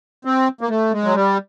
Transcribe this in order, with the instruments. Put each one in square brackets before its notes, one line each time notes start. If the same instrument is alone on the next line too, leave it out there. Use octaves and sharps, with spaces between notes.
[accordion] C4
A#3
A3
G#3
F#3
G3